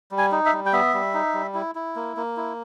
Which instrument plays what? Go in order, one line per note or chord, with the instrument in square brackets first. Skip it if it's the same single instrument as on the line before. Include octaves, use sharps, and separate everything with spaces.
[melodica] G3
G#5
D#4
E5
G3
G5
B3 E5
G3
D#4
G3
E4
E4
A#3
A#3
E4